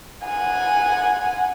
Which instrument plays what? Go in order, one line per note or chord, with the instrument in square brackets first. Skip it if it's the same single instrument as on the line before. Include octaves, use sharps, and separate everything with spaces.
[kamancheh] F#5 G#5